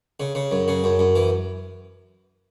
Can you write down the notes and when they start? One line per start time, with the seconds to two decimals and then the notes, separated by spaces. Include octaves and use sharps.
0.20 C#3
0.35 C#3
0.51 F#2
0.68 C#3
0.84 F#2
0.99 F#2
1.16 E3